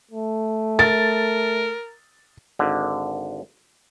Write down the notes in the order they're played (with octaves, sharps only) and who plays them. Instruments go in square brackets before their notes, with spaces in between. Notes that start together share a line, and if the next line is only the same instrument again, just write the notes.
[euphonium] A3
[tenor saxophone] A#4 [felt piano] A6
[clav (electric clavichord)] G#1 D3